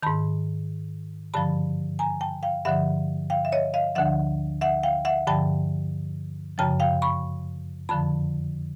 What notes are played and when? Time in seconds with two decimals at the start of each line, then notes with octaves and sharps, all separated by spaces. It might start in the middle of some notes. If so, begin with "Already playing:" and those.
0.03 G#2 D#3 A5 B5
1.34 G2 D3 F3 A5 B5
1.99 G#5 A#5
2.21 G5 A5
2.43 F5 G5
2.65 G2 D3 F3 E5 F#5
3.30 F5 G5
3.45 E5
3.52 C#5 D#5
3.74 D#5 F5
3.95 D2 D3 F3 E5 F#5
4.61 E5 F#5
4.83 F5 G5
5.05 E5 F#5
5.27 G2 D3 F3 G5 A5
6.58 F#2 C#3 F3 G5 A5
6.80 F5 G5
7.02 B5 C#6
7.89 F2 D3 F3 A5 B5